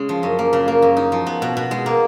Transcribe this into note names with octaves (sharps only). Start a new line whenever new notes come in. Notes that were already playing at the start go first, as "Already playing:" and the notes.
Already playing: C#3 G#3 C#4 G#4
F3
F#2
A#3
C#3
A#3
F#2
D#4
F3
B3
B2
B2
G#3
A#3